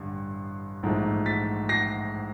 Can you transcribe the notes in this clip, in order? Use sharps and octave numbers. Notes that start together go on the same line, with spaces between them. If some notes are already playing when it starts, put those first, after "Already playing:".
Already playing: A1 G2 D3
A#1 G#2 E3 A3
A6 B6
A#6 C7